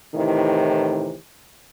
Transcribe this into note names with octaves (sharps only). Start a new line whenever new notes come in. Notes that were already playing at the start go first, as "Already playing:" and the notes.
A2 C3 D#3 E3